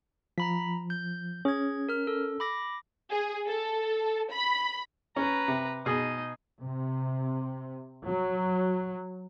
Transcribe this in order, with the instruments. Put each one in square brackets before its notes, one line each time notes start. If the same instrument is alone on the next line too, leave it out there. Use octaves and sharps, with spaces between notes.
[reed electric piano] F3 [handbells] A#5 B5 B6
[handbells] G6
[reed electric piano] C#4 [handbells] G#4 G#6
[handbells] A#4 F6
A4
B5 D6 A#6
[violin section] G#4
A4
B5
[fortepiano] C#4 [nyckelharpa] B4 A#5
[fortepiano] C3
[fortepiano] B2 G#4 [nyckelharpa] D#4 D#5
[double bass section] C3
F#3